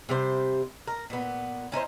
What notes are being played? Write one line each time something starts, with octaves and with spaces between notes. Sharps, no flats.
C3 G3 C5
A#4
A#2 B3
C#4 D#4 E4 C5